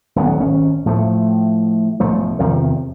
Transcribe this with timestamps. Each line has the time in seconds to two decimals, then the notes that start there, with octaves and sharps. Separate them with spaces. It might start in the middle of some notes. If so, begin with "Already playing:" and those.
0.16 D#1 B1 B3
0.40 G#1 C#4
0.86 A2 F3 A3
2.00 B1 G#2 F3 A3
2.39 E2 C3 D#3 F3